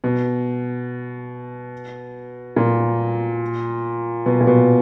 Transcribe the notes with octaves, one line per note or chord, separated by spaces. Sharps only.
B2
A#2
B2
A#2
B2